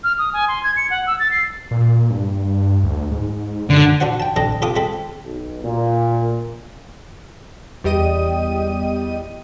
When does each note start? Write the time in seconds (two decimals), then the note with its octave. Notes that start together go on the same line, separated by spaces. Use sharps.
0.04 F6
0.19 D#6
0.33 G#5
0.48 C6
0.64 G#6
0.77 C#7
0.90 F#5
1.07 E6
1.20 A6
1.31 C7
1.71 A#2
2.10 G2
2.83 D2
3.11 G#2
3.70 F#2 D3
4.00 D4 F#4 C5 F#5
4.20 G5 A5
4.36 C4 D4 A4 D#5 A#5
4.62 C3 F4 A4 D6 D#6
4.76 G#3 C4 A4 B5
5.25 B1
5.64 A#2
7.84 E2 G3 G4 D#5 D#7